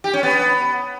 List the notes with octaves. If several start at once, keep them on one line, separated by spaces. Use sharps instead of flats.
G4
C#4
B3